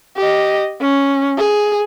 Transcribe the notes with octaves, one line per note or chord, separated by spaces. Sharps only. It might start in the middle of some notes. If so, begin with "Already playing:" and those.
G4 D#5
C#4
G#4